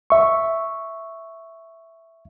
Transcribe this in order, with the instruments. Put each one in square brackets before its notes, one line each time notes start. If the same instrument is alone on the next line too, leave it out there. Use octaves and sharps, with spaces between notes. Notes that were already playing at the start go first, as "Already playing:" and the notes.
[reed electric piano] E5 C#6